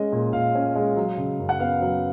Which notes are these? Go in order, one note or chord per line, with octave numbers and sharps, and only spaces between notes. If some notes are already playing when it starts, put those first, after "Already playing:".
Already playing: G#3 C#4 D#5
A#2
A#2 F5
C#4
G#3
F#3
C#3
F#2
F#5
B3 F5
F#3